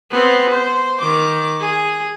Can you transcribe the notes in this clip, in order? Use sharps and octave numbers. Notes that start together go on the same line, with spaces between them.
B3 C4
C5
D#3 D6
G#4